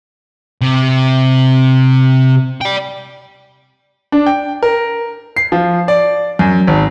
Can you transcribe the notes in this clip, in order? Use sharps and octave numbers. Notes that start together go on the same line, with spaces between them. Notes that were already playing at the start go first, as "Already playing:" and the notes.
C3
D5 G5
D4
G5
A#4
C7
F3
D5
F#2
G#1